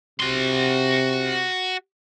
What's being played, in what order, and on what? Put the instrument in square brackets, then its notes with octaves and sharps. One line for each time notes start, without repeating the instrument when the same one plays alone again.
[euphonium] C3 [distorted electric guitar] F#4 C6